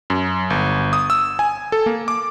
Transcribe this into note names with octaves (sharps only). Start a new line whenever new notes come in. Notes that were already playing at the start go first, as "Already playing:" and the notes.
F#2
G1
D#6
E6
G#5
A4
A#3
D6